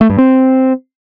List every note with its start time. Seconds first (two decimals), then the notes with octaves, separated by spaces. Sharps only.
0.01 A3
0.10 G2
0.18 C4